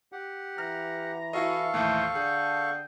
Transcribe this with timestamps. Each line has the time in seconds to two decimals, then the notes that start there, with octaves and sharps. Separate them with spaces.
0.12 G4 F#5
0.58 E3 A#5 F6
1.33 E4 F#4 A4 D#5 F5 C#6
1.74 D#2 A2 E3 A3 C5
2.15 D3 G#4 G5